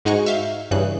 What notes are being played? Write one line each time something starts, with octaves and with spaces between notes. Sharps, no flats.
G#2 G#3 D#4 F#4 G#5 C#6
E5 F5 G6
G2 C#3 E3 G#4 F#6